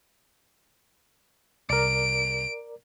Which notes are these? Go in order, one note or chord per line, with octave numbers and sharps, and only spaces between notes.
C2 A#4 D5 D7